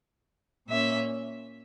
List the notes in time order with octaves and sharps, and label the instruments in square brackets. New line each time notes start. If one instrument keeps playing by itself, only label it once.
[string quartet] A#2 A#3 C#4 E5